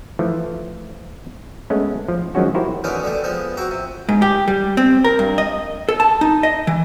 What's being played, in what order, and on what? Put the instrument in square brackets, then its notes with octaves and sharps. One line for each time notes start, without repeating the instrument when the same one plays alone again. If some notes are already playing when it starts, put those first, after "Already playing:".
[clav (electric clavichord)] E3 F3 A3
G#3 A3 B3 C#4
F3
D#3 F3 F#3 G#3 C#4 F#4
E4 F#4 G4 A#4 C5
[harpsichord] B2 D3 D#3 B3 C#4
D3 G3 A3
F3 G#3 B3
C4 F#4 A#5
C3
[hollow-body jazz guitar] G#2
G4
G3
C4
A#4
G2
D#5
A4
A5
D#4
D#5
E3